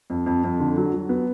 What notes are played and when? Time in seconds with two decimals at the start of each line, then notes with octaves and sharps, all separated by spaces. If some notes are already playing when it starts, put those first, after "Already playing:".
0.10 F2
0.26 F2
0.44 F2
0.60 D3
0.77 F#3
0.94 F#3
1.09 B3